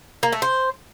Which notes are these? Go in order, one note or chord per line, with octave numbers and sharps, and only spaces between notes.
A#3
A3
C5